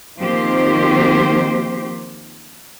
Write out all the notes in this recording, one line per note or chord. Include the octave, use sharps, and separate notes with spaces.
D#3 F3 A#3 C4 G4 C5